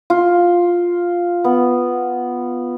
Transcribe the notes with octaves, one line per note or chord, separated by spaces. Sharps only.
F4
B3